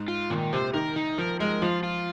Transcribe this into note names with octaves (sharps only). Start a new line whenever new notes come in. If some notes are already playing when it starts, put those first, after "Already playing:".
Already playing: G#2
F4
A#2 D#3
C3 C5
D#3 A#4
D#4
F3 A#4
G#3 A#4
F3 F4
F4